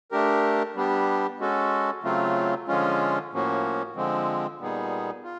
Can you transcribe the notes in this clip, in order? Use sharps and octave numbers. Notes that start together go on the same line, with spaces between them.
A3 D4 G4 A#4
G3 B3 D4 G4
G#3 C#4 F#4 A4
C#3 F#3 A3 C4 F4
D3 F3 G#3 C#4 F4
A2 F3 A#3 C#4 F#4
D3 F3 G#3 C4
A#2 G3 B3 D#4 G#4
F4